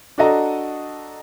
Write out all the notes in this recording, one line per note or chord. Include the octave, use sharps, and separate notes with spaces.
D4 F#4 A4 D#5 A#5